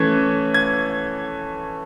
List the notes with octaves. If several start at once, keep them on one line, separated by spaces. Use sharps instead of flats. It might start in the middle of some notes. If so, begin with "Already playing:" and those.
Already playing: E3 A3 C#4 G#6
G#6